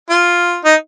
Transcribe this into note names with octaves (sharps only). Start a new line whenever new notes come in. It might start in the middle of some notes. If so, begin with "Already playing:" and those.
F4
D#4